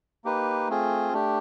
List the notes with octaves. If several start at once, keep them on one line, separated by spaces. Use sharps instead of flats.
A#3 D#4 G4 B4
A3 C4 F4 G#4
A3 D4 G4